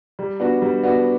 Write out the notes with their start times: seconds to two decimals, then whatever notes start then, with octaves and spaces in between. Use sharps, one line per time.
0.19 G3
0.40 B3 D4 F#4
0.62 G3
0.83 B3 D4 F#4